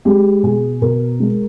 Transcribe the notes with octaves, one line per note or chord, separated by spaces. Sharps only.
G#3 G4
B2 G#4
B2 A#4
G#3